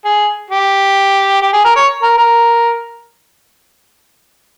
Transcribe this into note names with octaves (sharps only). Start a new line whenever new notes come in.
G#4
G4
G4
G#4
A#4
C#5
A#4
A#4